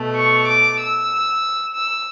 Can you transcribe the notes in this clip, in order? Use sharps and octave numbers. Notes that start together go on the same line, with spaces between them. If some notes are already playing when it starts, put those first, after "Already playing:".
Already playing: B2 A3
C#6
D6
E6
E6